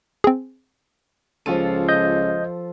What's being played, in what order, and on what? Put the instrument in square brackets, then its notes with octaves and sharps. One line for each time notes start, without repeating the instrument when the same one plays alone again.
[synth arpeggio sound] C4 G#4
[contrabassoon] C#2 [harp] F3 F4 A4 [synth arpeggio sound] D#7
[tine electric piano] D#5 G6